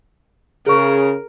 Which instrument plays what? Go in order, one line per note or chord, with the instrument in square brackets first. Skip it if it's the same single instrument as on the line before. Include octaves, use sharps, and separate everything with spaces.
[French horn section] C#3 [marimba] G#4 C#6 [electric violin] A#4